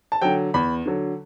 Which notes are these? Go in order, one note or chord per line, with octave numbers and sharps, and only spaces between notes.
A5
D3 F#3 G5
E2 B5
D3 F#3